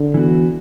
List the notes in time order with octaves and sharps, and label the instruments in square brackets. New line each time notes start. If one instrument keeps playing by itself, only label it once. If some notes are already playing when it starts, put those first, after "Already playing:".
Already playing: [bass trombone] D3
[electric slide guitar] E3 B3 F#4